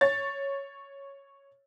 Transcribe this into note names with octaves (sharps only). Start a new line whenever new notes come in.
C#5 A6